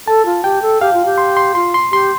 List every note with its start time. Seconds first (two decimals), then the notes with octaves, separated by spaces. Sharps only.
0.07 A4 A5
0.25 F4
0.44 G4 G5
0.62 A4
0.81 G4 F5
0.93 F4
1.05 G4
1.18 C6
1.37 C6
1.55 F4 C6
1.74 C6
1.91 G4 C6